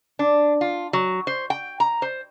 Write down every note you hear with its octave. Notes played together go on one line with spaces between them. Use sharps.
D4
F4
F#3
C5
G5
A#5
C5